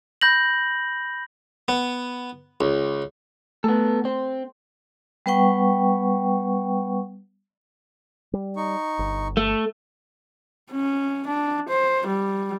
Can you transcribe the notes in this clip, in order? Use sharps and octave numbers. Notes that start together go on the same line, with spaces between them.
B5 G6 A#6 F#7
B3
C#2
A3 B3 A4
C4 C5
G3 B3 B4 F#5 G5 C#6
G3
D#4 C#6
G1
A3
C#4
D4
C5
G3